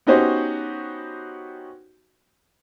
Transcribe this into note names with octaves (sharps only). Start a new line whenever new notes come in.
B3 C#4 D#4 F#4 G4 C5